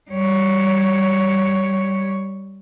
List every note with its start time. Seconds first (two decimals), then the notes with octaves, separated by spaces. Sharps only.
0.11 G3 C#5